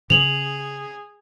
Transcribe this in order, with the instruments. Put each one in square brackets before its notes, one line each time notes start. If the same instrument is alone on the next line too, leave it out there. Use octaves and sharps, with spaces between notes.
[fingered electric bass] C#3 [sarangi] G#4 [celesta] F7 F#7